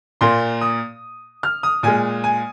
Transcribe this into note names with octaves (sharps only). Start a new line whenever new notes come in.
A#2 A#3 C6
D#6
F6
D#6
A#2 G#3 G#5
G#5